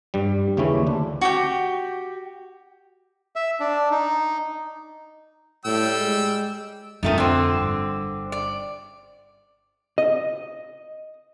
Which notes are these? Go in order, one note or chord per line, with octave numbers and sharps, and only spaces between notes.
G2 G3
D#2 C#3 E3 G3 C#4 E4
D2 D4
F#4 G4 G5
E5
D4
D#4
A2 G3 G5 E6
G#3
F2 D#3 A3 D#4 F4
D3 C4
G1
D5
D#5